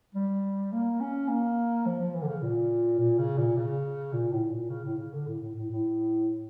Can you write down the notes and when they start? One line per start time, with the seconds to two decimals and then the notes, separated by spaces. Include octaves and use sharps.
0.15 G3
0.72 A#3
1.00 C#4
1.28 A#3
1.86 F3
2.00 F3
2.15 E3
2.22 D3
2.28 C#3
2.42 A#2
2.99 A#2
3.19 C#3
3.38 A#2
3.57 C#3
4.13 A#2
4.32 A2
4.51 A#2
4.70 C#3
4.84 A2
4.98 C#3
5.13 D3
5.27 A2
5.42 A2
5.55 A2
5.70 A2